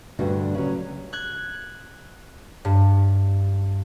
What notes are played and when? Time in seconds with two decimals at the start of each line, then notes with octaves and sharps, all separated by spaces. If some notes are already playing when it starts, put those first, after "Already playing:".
0.19 D2 G2 D3 G3 F#4
0.54 C#3 F#3
1.13 F#6 G#6
2.65 G2